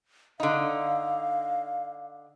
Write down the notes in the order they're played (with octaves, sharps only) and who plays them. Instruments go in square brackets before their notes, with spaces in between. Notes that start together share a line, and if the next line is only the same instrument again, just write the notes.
[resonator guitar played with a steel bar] D3 D#4 [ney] F5